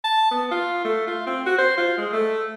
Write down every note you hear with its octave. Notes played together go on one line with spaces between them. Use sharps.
A5
B3
F4
A3
F4
C4
F#4
C5
F4
G#3
A3